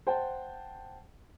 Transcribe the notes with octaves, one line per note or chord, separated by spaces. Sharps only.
C5 F#5 G5 A5